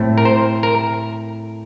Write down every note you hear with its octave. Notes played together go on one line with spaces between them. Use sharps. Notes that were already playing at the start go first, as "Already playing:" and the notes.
Already playing: A2 A3 C4
A#4
C5
A#4